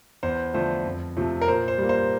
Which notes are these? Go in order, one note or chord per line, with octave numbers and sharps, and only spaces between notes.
E2 C5
D3 F3 A3 C5
F2
C3 F3 A3
A#4
A#2 C5
C5
G3 A#3
C5